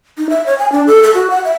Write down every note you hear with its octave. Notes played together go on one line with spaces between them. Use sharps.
D#4
E5
C#5
G#5
D4
A4
A4
F#4
F#5
E5